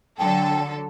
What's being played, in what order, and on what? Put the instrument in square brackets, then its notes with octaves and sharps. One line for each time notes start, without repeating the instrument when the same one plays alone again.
[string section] D3 F#3 A4 [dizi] G5